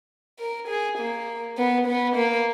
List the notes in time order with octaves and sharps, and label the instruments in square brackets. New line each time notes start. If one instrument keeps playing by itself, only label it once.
[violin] A#4
G#4
A#3
B3
B3
A#3